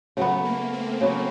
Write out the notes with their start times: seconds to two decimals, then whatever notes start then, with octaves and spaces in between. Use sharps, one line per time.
0.17 C#3 F#3 A3 B3
0.45 A#3
0.73 C4
1.01 C#3 F#3 B3